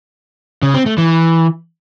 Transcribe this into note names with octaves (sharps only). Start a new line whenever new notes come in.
C#3
C4
A3
E3